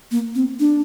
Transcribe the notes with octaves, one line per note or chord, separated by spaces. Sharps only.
A#3
C4
D4